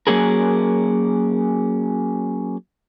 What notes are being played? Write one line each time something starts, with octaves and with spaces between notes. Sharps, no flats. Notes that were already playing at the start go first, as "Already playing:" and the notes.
F#3 A#3 C#4 G#4 A#4